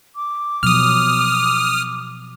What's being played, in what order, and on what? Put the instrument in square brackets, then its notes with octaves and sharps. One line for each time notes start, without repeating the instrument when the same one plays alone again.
[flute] D6
[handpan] B2 F3 F#3 [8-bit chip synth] D#6 F6